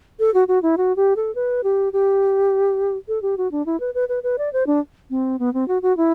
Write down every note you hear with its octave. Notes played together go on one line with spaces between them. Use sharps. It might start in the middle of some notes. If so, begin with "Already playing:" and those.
A4
F#4
F#4
E4
F#4
G4
A4
B4
G4
G4
A4
G4
F#4
D4
E4
B4
B4
B4
B4
D5
C5
D4
C4
B3
C4
F#4
F#4
E4